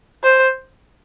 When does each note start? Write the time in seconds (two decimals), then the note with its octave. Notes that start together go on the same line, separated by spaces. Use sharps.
0.24 C5